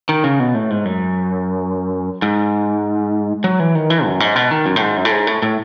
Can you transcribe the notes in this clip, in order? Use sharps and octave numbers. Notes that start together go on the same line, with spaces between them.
D#3
C#3
B2
A2
G#2
F#2
G#2
F#3
E3
D#3
E3
F#2
G#2
B2
D#3
F#2
A2
G#2
F#2
A2
G#2
A2
A2